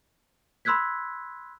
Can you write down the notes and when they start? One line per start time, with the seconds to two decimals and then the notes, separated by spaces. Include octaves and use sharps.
0.65 B5 C6 E6 F#6 G#6 B6